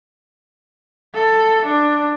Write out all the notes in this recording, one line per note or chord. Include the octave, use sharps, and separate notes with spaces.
A4
D4